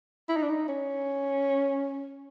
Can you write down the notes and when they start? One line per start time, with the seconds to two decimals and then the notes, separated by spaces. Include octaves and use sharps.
0.29 E4
0.36 D#4
0.43 D4
0.50 D#4
0.68 C#4